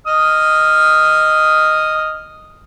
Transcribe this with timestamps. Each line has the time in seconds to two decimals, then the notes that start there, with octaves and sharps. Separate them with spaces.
0.07 D#5 D#6 F6